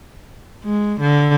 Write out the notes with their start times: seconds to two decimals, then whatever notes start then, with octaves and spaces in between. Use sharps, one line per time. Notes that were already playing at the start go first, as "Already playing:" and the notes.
0.64 G#3
1.01 D3